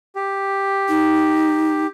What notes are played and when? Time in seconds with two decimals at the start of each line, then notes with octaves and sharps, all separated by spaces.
0.15 G4
0.89 D#4